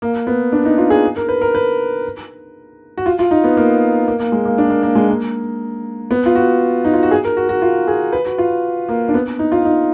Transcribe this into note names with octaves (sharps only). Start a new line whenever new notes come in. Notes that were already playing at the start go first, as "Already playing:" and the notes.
A#3
B3
D4
D#4
F4
G#4
A#4
B4
A#4
B4
F#4
F4
F4
D#4
B3
A#3
A#3
A#3
G#3
A#3
D4
A#3
A#3
G#3
A#3
B3
F4
F#4
D#4
F4
F#4
G#4
A#4
F#4
F#4
F4
G#4
B4
F#4
F4
A#3
D4
B3
D#4
F4
D#4